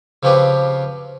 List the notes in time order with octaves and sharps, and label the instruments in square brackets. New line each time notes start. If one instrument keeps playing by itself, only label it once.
[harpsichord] C#3 F3 C4 C#4 G4 B4